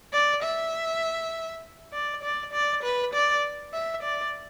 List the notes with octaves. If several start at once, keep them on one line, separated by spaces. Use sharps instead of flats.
D5
E5
D5
D5
D5
B4
D5
E5
D5